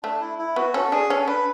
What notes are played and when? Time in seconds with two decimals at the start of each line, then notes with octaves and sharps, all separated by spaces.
0.03 A3 D4
0.21 E4
0.39 E4
0.56 B3 F#4
0.74 C#4 A4
0.92 D4 G#4
1.10 C#4 A4
1.27 D4 B4